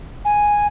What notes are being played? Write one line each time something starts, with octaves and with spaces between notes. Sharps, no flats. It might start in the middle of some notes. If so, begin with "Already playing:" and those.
G#5